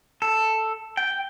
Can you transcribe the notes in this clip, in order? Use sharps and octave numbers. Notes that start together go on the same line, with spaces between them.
A4
G5